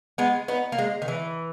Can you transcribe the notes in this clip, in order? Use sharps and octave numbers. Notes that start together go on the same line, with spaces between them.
G#3 B3
B3 D#4
A#3
G#3
D#3
E3